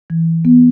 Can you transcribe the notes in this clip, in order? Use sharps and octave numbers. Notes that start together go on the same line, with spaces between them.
E3
B3